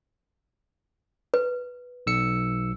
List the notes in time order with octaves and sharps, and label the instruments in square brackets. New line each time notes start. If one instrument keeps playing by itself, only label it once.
[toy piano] B4
[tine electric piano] B1 E6 C#7